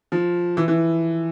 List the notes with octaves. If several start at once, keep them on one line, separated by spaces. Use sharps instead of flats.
F3
E3
E3